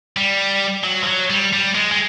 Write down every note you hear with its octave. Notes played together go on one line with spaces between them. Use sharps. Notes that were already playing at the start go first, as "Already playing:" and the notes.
G3
F#3
F3
F#3
G3
G3
G#3
G#3